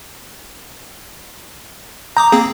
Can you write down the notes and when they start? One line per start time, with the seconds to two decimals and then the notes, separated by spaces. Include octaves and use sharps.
2.17 A#5 D6 D#6 G6
2.32 A#3 C4 G#4